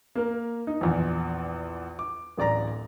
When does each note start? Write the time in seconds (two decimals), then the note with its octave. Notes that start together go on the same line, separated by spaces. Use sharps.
0.15 A#3 A#4
0.67 D#4
0.81 A#1 E2
1.99 D6
2.38 D1 A1 D5 A#5 A#6